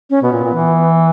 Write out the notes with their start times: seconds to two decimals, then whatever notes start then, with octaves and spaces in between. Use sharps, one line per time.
0.10 C#4
0.22 B2 B3
0.33 A#2
0.44 A#2
0.54 E3